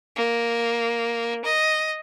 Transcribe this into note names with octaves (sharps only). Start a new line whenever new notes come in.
A#3
D#5